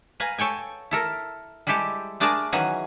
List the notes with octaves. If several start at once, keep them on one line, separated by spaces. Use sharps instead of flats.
B4 F5 G#5 A#5
A4 C#5 G5 G#5
E4 A4 A#4
G3 G#3 E4 G4 A4
A3 D4 G#4 A#4 D5 A5
D#3 E3 F#3 C#4 F#4 G#4